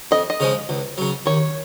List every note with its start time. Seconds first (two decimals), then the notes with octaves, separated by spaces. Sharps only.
0.11 F2 D#5
0.30 D#5
0.40 C#3 F3 G#3
0.69 C#2
0.98 C#3 F#3
1.26 D#2 C#5